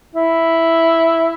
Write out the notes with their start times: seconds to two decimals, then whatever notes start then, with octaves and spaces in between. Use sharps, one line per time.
0.15 E4